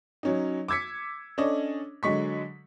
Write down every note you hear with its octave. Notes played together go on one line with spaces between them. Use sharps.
F#3 C#4 D#4
D6 E6 G#6 B6 C#7
C#4 D4 A4 C#5 D#5
D3 F#3 G#3 C#6 B6